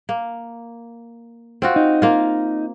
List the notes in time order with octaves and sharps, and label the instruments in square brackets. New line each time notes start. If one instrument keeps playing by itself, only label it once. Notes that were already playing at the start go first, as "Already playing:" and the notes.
[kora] A#3
C4 F4 F#4
[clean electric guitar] D#4
[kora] A#3 F4